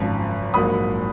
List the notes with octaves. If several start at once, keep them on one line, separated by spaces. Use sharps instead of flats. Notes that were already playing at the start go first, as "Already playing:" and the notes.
Already playing: G#1 F#2 C#3 F3
A#1 G#2 F#3 A#3 B5 D#6